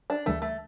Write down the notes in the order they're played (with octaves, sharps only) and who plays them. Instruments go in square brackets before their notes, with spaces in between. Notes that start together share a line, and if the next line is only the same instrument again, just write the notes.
[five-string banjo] D4
[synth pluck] D2 C#3 E3 G3 D4 [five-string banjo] A3
[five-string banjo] A3